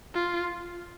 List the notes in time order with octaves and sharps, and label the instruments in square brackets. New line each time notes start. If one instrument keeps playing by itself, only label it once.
[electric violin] F4